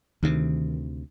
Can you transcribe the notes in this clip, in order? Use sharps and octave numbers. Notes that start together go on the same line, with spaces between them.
D2 C3 D#3